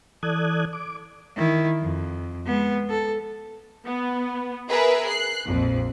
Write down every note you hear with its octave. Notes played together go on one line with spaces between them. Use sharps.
E3 A4 D5 D#6 F#6 G#6
D6
D#3 E4
F2
G#3 B3
A4
B3
G#4 A#4 B4 E5
F#6 C7
A#1 F2